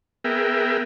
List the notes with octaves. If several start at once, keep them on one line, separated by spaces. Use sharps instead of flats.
B3 G#4 A#4 E5 G5